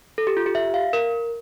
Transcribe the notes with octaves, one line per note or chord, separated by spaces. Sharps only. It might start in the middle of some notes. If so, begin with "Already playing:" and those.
A4
G4
F4
G4
E5
F5
A#4